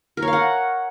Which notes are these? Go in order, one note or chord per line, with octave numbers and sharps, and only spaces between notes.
A#4
C#5
F5
F#5